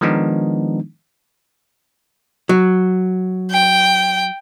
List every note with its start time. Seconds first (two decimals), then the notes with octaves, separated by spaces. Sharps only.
0.01 D#3 F3 G#3 B3 D4 D#4
2.49 F#3
3.51 G5